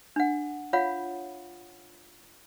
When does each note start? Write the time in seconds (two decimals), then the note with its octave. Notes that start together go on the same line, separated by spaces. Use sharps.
0.16 D4 F#5
0.73 F4 C#5 F5 F#5 B5